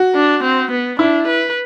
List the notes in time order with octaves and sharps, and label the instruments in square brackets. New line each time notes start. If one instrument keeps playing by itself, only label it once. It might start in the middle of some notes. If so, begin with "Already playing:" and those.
Already playing: [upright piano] F#4
[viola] D4
C4
B3
[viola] D4 [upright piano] E4
[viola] B4